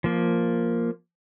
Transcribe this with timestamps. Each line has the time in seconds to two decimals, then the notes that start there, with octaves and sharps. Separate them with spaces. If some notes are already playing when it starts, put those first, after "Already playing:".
0.04 F3 A#3